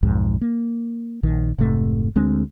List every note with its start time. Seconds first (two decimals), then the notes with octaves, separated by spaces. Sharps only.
0.03 B1 F2 G#2
0.41 A#3
1.23 A#1 D#3
1.58 F1 G#2 C3 A3
2.16 D2 G#3 C4 D4